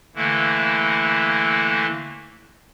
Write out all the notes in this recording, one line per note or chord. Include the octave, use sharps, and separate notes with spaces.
D3 E3 A3 A#3 E4